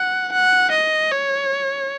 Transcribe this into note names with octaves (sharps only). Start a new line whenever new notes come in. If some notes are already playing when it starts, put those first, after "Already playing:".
Already playing: F#5
F#5
D#5
C#5